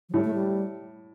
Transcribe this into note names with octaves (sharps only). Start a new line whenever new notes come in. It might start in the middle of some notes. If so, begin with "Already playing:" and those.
F3
A2 G3
A3
G3